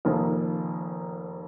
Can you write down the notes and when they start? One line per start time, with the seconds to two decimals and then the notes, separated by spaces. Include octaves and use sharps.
0.05 F1 F2 D#3 A#3